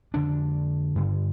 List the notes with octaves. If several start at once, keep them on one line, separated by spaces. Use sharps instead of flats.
F2 D3 D4
G2 D3